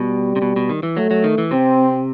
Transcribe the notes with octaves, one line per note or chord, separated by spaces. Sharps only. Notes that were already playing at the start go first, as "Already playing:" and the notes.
Already playing: B2 G3
C3
B2
B2
D#3
E3
F#3 A3
F#3
D#3
E3
C3 C4